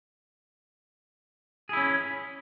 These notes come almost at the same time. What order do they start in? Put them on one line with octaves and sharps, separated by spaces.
G#4 E4 C#4